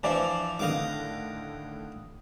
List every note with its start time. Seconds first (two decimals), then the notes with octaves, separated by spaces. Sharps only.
0.03 E3 F3 D4 D5 E5
0.59 A2 D3 D#3 D#5 F5 D6